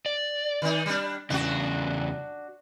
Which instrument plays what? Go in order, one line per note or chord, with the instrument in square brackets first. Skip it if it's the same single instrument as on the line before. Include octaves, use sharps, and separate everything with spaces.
[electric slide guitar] D5
[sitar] D#3 D#4
G3 D4
[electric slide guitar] E2 C#3 [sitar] D4 F#4